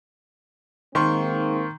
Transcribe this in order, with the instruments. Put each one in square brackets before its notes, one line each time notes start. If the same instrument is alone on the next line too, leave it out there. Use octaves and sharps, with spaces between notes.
[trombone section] G#2 A#3 C4 [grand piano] D#3 C6 C#6